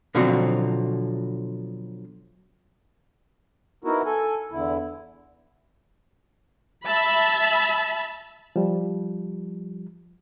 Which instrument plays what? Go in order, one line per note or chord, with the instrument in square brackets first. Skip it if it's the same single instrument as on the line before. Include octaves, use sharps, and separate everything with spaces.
[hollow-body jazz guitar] B2 D3 F3 F#3 C4 F#4
[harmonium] B3 D#4 E4 F#4 A#4
A4 G#5
E2 D3 E4
[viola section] E5 A5 B5
[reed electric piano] F3 G3